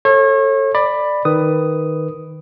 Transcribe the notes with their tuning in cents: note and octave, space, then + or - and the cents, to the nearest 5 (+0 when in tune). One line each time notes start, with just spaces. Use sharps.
A4 +10 C#5 -35
D5 +15 B5 +0
D#3 +5 B4 +10 D#6 +0